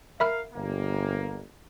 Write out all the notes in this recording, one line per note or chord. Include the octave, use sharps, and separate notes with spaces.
A#4 E5 F5 B5 F6
G1 A#3